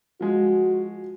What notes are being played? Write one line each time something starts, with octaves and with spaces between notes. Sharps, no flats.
F3 G#3 F#4